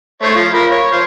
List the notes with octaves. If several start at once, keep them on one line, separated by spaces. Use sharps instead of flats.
A3 C5 C#5
F3 F4
A#4 B5
C#5
F4 C5